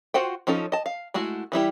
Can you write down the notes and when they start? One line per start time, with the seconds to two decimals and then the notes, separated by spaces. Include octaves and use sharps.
0.14 F4 F#4 C5 F#5 G5
0.47 F3 C#4 D#4 A4
0.72 D#5 A5
0.86 F5
1.14 G#3 A3 E4 F#4
1.52 E3 G3 E4 G4